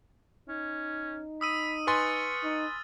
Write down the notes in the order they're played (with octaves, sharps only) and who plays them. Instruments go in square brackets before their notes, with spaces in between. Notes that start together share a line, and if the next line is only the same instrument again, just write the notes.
[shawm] C#4 [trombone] D#4
[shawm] B5 [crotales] D#6 E6 D#7
[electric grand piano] B4 G#5 C6 [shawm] C#6 [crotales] F6 A6
[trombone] D#4